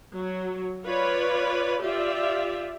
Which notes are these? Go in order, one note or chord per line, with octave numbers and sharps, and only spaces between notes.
F#3
F4 B4 C#5 D5
F4 G4 D5 E5